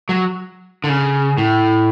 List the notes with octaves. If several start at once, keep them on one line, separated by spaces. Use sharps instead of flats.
F#3
D3
C#3
A2